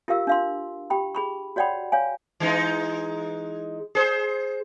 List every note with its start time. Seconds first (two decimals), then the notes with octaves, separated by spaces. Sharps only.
0.08 F4 G4 A#4 F5 E6
0.27 D4 F5 C6
0.90 G4 G5 B5
1.15 G#4 B5 C#6
1.56 F#4 C#5 D5 F#5 G5 B5
1.92 C#5 F5 G#5
2.40 E3 G#3 D#4
3.95 G#4 B4 C5